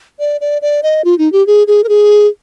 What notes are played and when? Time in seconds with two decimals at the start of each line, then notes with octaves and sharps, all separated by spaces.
0.19 D5
0.41 D5
0.62 D5
0.83 D#5
1.05 F4
1.18 D#4
1.32 G4
1.47 G#4
1.67 G#4
1.84 A#4
1.89 G#4